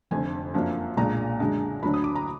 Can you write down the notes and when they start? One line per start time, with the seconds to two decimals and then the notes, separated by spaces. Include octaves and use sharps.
0.11 F1 F2 D3 G#5
0.54 F#2 F3 A#3 D4
0.97 B1 A#2 G#3 D4 A#5
1.40 F#2 D3 G#3 D4
1.83 D2 D3 F#3 D4 B5
1.94 D#6
2.04 D6
2.15 A#5